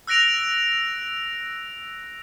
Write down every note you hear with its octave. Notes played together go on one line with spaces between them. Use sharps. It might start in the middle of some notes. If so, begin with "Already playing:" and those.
E6 F#6 A#6 D7 F7